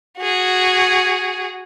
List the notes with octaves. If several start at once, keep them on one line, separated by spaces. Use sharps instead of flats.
F#4 G#4